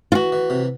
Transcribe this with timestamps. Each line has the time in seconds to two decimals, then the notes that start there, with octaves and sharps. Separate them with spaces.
0.12 F4
0.15 E3 F#4
0.32 E3
0.50 C3